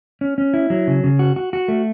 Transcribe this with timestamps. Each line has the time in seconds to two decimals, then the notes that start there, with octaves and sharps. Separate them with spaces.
0.21 C#4
0.38 C#4
0.54 E4
0.70 F#3
0.87 C#3
1.04 C#3
1.19 F#4
1.36 F#4
1.53 F#4
1.68 A3